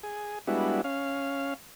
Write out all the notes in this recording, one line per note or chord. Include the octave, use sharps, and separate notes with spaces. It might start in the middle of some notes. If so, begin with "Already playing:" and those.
G#4
G3 G#3 B3 D4 E4 F#4
C#4 F5